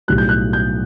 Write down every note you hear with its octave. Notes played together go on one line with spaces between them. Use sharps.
B1 A2 G3 F#6
G6
F#6
G6